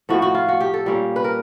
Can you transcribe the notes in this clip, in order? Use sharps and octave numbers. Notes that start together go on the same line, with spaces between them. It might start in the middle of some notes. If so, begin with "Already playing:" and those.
A2 F3 A3 C4 F#4
F#4
F4
F#4
G4
A4
A#2 G3 A#3 C#4
B4
A#4